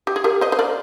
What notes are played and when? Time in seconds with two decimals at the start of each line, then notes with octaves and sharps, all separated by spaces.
0.07 G4
0.16 G#4
0.24 G4 A#4
0.41 C5 D#5
0.52 C5
0.59 A#4 D5